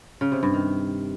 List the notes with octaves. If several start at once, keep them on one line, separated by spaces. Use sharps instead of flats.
C#3
C3
G2
D#3